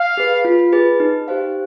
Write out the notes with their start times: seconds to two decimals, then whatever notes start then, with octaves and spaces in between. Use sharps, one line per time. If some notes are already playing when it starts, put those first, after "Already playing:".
Already playing: F5
0.17 G#4 B4
0.45 F4
0.73 G#4 B4
1.00 D#4
1.28 G4 C5 F5